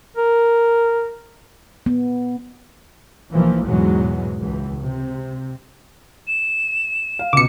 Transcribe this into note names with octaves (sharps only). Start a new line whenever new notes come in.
A#4
B3
B1 E3 F3 A#3
E2 G#2 B2 E3 F#3 G#3
C#2 E3
C3
E7
F5
C#2 B2 D6 C#7